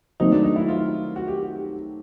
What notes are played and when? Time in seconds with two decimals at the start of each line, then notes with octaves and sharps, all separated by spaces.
0.20 D#3 F#3 A3 C4 D#4
0.32 D4
0.44 D#4
0.56 E4
0.69 F4
1.16 F#4
1.28 G4